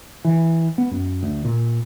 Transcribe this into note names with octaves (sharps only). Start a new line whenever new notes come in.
E3
B3
F#2
D2
A#2